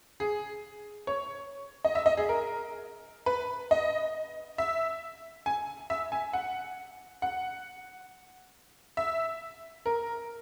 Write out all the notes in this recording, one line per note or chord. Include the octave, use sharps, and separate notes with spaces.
G#4
C#5
D#5
E5
D#5
G#4
A#4
B4
D#5
E5
G#5
E5
G#5
F#5
F#5
E5
A#4